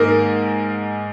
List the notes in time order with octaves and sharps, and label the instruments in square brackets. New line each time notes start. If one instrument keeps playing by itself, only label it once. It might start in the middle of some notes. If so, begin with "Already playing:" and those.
Already playing: [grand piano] G#2 D#3 A#3 A#4